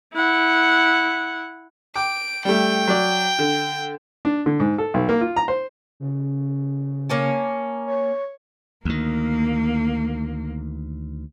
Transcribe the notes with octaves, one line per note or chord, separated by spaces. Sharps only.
E4 F#5
G5 D6 D7
G3 A3 G5
F#3 D5
D3
D4
D3
G#2
A4
B1
A#3
F4
A#5
C5
C#3
A#3 C#4 A5
C#5
D2 D#3 A#3